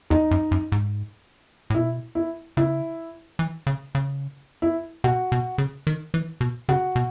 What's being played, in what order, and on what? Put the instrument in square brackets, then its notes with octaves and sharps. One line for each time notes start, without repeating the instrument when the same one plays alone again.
[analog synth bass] E2 [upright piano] D#4
[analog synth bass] F#2
F#2
G#2
A2
[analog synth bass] B2 [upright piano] E4
[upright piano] E4
[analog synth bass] C#3 [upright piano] E4
[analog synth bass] E3
C#3
C#3
[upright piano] E4
[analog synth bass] B2 [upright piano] F#4
[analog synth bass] B2
C#3
D#3
E3
B2
[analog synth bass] C#3 [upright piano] F#4
[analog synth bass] B2